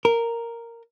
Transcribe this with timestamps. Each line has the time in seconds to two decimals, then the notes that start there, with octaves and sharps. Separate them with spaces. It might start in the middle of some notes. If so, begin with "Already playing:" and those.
0.05 A#4